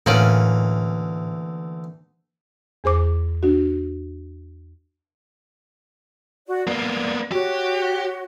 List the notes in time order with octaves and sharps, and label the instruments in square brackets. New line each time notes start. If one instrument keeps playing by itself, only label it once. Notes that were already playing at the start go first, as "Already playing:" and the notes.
[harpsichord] D2 E3 [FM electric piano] A2 [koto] A#3 C#4 D5
[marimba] E2 G#4 C5 D6
D4 F#4
[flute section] F#4 D5
[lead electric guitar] A#3 B3 [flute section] D5
[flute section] F#4 C#5 [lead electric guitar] G4